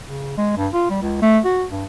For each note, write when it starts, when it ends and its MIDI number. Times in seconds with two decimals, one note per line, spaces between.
0.09 0.35 49
0.38 0.52 56
0.57 0.68 43
0.73 0.86 65
0.90 0.98 55
1.02 1.21 37
1.22 1.39 57
1.45 1.65 66
1.70 1.85 43